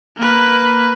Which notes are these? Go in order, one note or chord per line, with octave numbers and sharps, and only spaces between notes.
A#3 B4